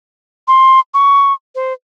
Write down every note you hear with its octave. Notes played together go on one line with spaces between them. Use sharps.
C6
C#6
C5